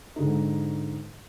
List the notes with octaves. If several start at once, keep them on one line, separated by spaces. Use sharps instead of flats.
G#2 D3 D#4